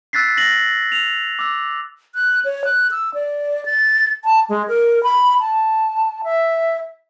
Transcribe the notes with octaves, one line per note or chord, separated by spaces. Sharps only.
E6 F#6 A6 B6 C7
A#6 F#7
F7
D6 E6
F#6
C#5
F#6
E6
D5
A6
A5
G#3
A#4
B5
A5
E5